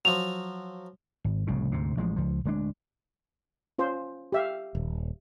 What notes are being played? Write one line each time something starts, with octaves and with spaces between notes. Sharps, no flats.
F3 F#3 F7
G#1
F1 C2 A2 C#3
D2 G#2 C3
A1 F3 G#3
C#2 F3
D1 G#3 D4
C#4 F4 C5
G4 E5 F5
D#1